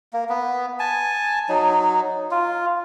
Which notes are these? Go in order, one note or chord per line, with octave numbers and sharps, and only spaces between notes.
A#3
B3
G#5 A5
F#3 D#4
F4